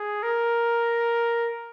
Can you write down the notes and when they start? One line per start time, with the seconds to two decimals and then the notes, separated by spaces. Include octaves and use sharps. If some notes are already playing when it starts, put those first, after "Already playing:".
Already playing: G#4
0.23 A#4